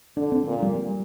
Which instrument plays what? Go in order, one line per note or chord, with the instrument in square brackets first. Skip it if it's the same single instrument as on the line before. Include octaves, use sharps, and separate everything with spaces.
[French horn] D3 [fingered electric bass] D4
[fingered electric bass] C4
[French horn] A#2
[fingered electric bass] G3